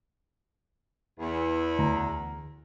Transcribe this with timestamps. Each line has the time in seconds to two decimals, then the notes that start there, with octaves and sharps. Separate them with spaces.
1.19 E2
1.79 D2 A#5